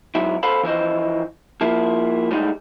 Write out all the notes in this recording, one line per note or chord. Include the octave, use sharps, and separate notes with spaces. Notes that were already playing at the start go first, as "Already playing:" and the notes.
G#2 F#3 E4
A4 C5 F5 B5
E3 F3 E4 G4 C5 D#5
F3 A#3 E4
A2 G3 G#3 D#4